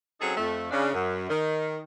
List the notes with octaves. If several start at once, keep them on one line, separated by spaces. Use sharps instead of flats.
F#3 C4 C#4 D#4 G#4 A4
F2 A3
C#3 D4
F#2
D#3